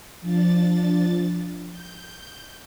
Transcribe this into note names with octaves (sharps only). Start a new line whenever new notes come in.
F3 D4 A6
G6